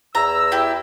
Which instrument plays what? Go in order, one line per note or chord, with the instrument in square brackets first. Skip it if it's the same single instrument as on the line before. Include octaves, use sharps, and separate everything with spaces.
[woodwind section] E2 E6 [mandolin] A#5
[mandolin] E4 G4